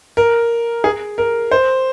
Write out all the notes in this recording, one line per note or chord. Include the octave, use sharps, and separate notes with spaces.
A#4
G#4
A#4
C5